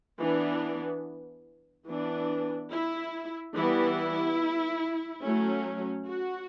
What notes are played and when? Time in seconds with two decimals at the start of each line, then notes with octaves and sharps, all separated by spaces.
0.20 E3 B3 D4
1.88 E3 B3 D4
2.71 E4
3.55 E3 G3 B3 E4
5.23 F#3 A3 C#4
6.07 F#4